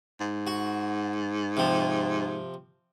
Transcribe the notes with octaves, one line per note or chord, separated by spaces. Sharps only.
G#2
F#4
C3 F3